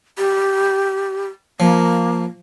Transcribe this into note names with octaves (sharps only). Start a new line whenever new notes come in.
G4
F3 A#3